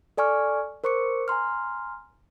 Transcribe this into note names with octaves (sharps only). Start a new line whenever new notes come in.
A4 D5 G#5 C#6 F6
A#4 C5 C#6 D6 C#7
G#5 A#5 C6 F6